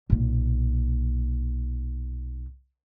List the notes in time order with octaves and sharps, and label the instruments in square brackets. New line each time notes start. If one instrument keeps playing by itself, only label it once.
[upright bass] B1 A#2